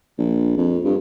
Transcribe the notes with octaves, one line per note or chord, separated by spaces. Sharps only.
A#1
F2
G2